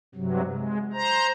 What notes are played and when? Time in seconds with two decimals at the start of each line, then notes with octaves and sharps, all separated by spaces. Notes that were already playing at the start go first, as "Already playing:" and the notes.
0.15 G2 C3 F#3
0.52 G#3
0.93 C5 A#5